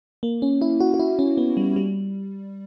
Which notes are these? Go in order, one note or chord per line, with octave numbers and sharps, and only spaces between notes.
A#3
C#4
E4
F#4
F#4
E4
C#4
B3
G3
G3